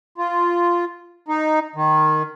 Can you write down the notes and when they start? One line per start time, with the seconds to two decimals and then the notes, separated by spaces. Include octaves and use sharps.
0.18 F4
1.28 D#4
1.76 D#3